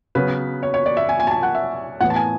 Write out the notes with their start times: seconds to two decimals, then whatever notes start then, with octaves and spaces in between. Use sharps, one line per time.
0.15 C#3 F#3 B3 B4
0.63 C#5
0.74 C#5
0.86 D5
0.97 E5
1.09 G#5
1.20 G#5
1.27 A5
1.31 G#5
1.43 F#5
1.55 E5
2.01 A2 E3 B3 F#5
2.10 A5
2.16 G#5